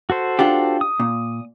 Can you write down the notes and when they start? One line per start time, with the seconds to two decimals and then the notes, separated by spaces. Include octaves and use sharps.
0.10 F#4 A4 C5
0.39 D4 F4 G4
0.81 D#6
1.00 A#2